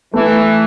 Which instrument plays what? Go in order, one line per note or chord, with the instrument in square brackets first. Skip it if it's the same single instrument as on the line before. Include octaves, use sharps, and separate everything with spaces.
[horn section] E3 [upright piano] A3